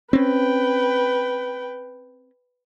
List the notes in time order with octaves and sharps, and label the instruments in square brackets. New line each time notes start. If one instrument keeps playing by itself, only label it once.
[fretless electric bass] C4 C#4 [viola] B4 G5